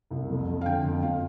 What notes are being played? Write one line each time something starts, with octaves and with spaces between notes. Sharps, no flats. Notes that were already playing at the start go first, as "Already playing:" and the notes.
C2
F2
F2
F5
D3 G5
F2
F2 F5